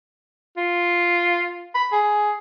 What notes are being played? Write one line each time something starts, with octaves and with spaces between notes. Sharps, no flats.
F4
B5
G#4